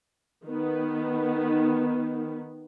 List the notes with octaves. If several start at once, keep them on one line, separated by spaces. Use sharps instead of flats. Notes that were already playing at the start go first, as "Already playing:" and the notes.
D#3 B3